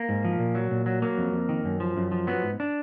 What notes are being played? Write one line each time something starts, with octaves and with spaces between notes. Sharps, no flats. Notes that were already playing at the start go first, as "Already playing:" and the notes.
Already playing: A#3
G#2
F3
A#2
F#3
A#2
F#3
F#3 A#3
F2
F2
D#3
F#2
F3
F#2
F3
F#3 B3
G#2
D4